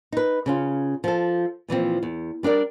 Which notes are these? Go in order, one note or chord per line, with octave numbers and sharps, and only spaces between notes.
D#4 B4
C#3 C#4 F4
F3 A4
A#2 E3 F3 C4
E2
G3 D4 A#4 D5